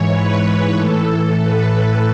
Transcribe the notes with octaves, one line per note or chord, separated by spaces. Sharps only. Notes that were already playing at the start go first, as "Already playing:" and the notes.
Already playing: G#2 E3 C#5
B4
A2 E3 A4
B4